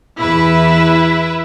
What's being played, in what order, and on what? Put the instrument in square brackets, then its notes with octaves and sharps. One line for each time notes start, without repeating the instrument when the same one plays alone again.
[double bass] E2 [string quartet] E4 B4 E5